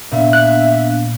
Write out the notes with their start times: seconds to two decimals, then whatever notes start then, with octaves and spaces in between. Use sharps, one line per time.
0.11 A#2 B3 D4 E5 F5
0.33 F#6